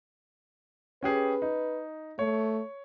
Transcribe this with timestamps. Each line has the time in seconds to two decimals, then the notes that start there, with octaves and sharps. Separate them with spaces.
1.03 C#4 G4 G#4 B4
1.42 D#4
2.19 A3 C#5